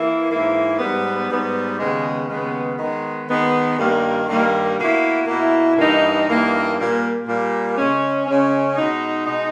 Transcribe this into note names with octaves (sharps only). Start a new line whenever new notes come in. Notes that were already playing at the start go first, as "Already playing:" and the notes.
Already playing: E3 A#3 E4
G#2 E3 A#3 E4
G#2 G3 B3
G#2 G3 B3
D#2 C#3 G#3 B3
D#2 C#3 G#3 B3
D#3 G#3 B3
D#3 G#3 B3
G2 D#3 G3 A#3
G2 D#3 G3 A#3
B2 A#3 E4
B2 A#3 E4
G2 E3 A#3 D#4
G2 E3 A#3 D#4
A#2 G3 A#3
A#2 G3 A#3
C#3 G#3 C#4
C#3 G#3 C#4
B2 G#3 D#4
B2 G#3 D#4